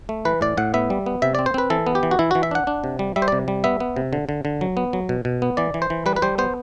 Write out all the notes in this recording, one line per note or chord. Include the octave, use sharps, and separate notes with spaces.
A3
E3 B4
A2 D5
A2 F#5
B3 E5
G3
B3
C3 E5
C4 D5
C5
C4 B4
E3 A4
B3
G4
E3
F#4
E3 E4
E3 F#4
E5
D4 F#5
D4
C3
G3
G3 E5
C5
C3 D5
G3
B3 E5
B3
C3
D3
D3
D3
F#3
B3
F#3
B2
B2
B3
E3 D5
E3
C5
E3
G3 B4
B4
G3 C5
B3 C5